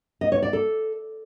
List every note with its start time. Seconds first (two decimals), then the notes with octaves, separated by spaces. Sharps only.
0.21 D#5
0.32 C#5
0.42 D5
0.53 A4